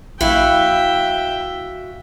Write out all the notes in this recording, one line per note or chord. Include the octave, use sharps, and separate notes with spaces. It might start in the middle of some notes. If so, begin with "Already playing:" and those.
A#1 E4 F#4 E5 F5 G5